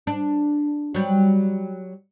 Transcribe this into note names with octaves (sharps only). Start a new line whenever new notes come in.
D4
F#3 G3